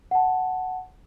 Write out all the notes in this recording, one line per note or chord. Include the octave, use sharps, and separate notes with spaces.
F#5 A5